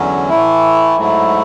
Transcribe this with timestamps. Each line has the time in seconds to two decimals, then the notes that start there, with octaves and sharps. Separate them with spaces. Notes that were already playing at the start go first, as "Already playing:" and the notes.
Already playing: E2 D3 F#3 C#4
0.29 A2 E3 A3 E4
0.97 G#2 F#3 A3 E4